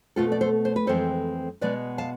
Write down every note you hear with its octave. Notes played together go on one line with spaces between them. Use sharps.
B2 A3 C4 F4 A4
D5
A4 C5
C5
B4
F2 E3 G#3 C4 A4 C5
B2 G#3 B3 B4 D5
F5 A5